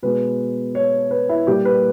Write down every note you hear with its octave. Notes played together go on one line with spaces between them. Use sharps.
B2 G#3 B3 B4
C#5
B4
E4
A#2 G3 A#3 G4
B4